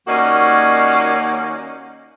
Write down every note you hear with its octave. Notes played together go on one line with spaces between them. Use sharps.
D#2 A#3 C#4 D#4 F#4 D5